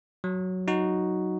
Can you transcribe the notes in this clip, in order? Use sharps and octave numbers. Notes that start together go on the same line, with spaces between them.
F#3
D#4 F#4